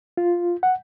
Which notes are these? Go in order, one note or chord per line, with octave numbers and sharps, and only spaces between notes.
F4
F#5